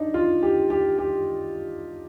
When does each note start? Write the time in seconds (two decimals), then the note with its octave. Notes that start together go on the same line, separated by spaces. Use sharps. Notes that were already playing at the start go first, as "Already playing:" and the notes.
Already playing: D4 D#4
0.14 F4
0.43 G4
0.70 G4
0.98 G4